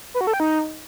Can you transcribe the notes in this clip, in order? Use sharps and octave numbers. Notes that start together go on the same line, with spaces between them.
B4
F#4
A4
G5
D#4